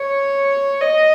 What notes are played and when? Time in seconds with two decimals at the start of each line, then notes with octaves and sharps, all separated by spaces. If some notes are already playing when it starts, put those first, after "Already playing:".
Already playing: C#5
0.81 D#5